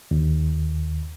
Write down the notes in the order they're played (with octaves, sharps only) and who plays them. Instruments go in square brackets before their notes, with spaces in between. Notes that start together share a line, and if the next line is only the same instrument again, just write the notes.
[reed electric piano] D#2